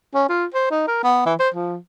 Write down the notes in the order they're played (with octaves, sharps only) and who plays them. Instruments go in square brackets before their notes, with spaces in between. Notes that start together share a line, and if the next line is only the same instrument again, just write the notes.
[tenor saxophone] C#4
F4
C5
D#4
A#4
B3
E3
C5
F3